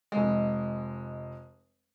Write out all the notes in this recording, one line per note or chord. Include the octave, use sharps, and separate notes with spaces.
F1 G#3